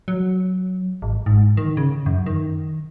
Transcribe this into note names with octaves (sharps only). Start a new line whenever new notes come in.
F#3
G#1
G#2
D#3
C#3
F#2
D#3